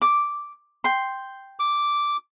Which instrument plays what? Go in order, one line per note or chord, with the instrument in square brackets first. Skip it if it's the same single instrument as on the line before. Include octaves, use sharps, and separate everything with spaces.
[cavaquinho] D6
G5 C6
[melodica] D6